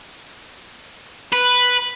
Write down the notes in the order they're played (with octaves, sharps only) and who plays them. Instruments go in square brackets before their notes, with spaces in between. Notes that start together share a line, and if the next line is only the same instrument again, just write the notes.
[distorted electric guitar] B4